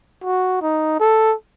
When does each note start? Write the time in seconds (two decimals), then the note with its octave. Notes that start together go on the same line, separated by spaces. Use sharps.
0.23 F#4
0.62 D#4
1.00 A4